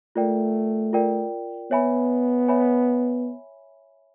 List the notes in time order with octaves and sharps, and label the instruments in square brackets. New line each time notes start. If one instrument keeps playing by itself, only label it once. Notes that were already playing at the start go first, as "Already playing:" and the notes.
[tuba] A3 [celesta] F4 A#4 D5 G5
[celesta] F4 A#4 D5 G5
[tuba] B3 [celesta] C#5 E5 G#5 B5
[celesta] C#5 E5 G#5 B5